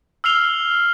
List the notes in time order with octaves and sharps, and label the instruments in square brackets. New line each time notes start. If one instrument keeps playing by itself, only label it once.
[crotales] E6 F6 C7 F7 G7